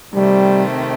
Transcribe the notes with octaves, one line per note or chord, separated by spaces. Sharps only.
C3 D#3 G3 A3 C4